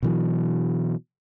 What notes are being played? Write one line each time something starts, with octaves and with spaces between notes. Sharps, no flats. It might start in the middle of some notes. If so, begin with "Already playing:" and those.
B2 E3 F#3